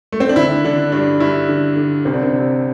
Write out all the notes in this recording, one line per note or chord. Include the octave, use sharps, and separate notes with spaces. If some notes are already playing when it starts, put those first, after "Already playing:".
A3
C4
D4
D3 E4
D3 D4
G2 D4
G2 E4
D3
D3
C2 C4
D4
C4
C3